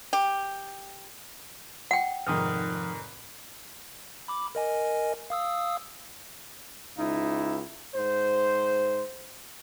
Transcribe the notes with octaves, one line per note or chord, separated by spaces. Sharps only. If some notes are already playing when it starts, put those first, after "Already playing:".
G4
F#5 G5
F1 G#2 D#3 F3 D#6 F6
B5 D6
A#4 D#5 G#5
F5 D#6 E6
C#2 D#4 E4
G#2 C5